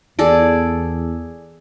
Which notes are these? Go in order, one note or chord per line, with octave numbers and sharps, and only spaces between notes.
E2 G#4 A4 D5